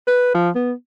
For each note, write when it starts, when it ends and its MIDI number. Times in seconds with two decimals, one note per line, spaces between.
0.08 0.33 71
0.35 0.50 53
0.55 0.73 59